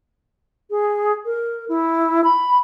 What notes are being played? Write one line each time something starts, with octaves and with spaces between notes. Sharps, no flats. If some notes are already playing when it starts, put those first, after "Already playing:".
G#4
A#4
E4
B5